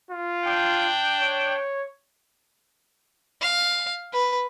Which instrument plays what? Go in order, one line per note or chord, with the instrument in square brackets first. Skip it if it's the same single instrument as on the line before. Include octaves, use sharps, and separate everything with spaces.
[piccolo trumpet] F4
[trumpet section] D4 G5
[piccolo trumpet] C#5
[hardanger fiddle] F5
B4